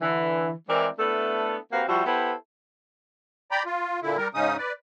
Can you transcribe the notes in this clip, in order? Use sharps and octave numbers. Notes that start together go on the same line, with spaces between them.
D3 E3
E3 G#3 C4 E4 A#4 D5
A3 B3 D4 E4 A4
A#3 C4 F#4 G4 B4 F5
F3 G3 E4 F#4
B3 E4 G4 A4 B4 C5
D5 G5 A#5 B5
F4
A#2 D3 E4
G3 A#4
G#2 C#3 C#4 D#4 D#6
B4 D5